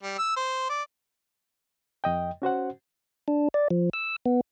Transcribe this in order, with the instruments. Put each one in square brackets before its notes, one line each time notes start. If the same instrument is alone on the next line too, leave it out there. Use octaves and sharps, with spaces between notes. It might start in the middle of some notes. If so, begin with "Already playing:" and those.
[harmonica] G3
E6
C5
D5
[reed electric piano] F2 D#5 G5
C#4 F#4 C5 F#5
[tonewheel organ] D4
D5
F3
E6
B3